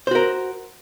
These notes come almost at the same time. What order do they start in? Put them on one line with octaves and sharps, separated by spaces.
C5 F#4 A#4